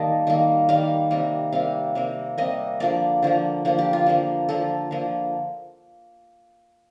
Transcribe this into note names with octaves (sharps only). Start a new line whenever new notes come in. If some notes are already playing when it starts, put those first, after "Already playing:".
Already playing: D#3 G3 A#3 D#5 A5
D#3 G3 A#3
D#3 G3 A#3 F5
C3 G3 A#3
C3 G3 A#3 F5
C3 G3 A#3
C3 G3 A#3 D#5
D3 F3 A#3 D5
D3 F3 A#3
D3 F3 A#3
G4
F4
D3 F3 A#3
D3 F3 A#3 A4
D3 F3 A#3